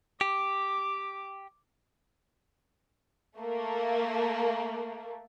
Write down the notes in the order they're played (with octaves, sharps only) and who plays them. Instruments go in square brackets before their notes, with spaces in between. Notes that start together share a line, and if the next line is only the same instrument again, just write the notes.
[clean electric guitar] G4 [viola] D6
[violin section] A3 A#3